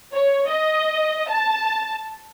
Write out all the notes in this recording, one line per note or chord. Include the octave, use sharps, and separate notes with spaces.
C#5
D#5
A5